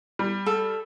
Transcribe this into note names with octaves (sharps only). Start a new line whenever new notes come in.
G3
A4